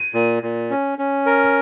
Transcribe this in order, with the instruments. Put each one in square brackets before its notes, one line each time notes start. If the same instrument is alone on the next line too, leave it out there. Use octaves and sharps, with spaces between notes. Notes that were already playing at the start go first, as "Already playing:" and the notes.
Already playing: [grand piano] D#7
[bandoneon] A#2
A#2
C#4
C#4
A#4